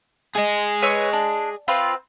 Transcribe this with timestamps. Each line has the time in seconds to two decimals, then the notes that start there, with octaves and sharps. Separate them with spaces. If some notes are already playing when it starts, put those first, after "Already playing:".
0.35 G#4 D#5
0.82 B4 C#5 E6
1.13 D4
1.68 C4 F4 B4